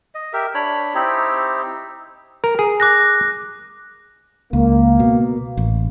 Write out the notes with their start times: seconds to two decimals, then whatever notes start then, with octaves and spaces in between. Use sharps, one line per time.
0.15 D#5
0.33 G4 A#4 E5
0.55 D4 C#5 B5
0.95 C4 D#4 E4 G4
2.44 A#4
2.59 G#4
2.80 D6 F#6 A#6
4.53 C#2 A#3
5.00 B2
5.57 A1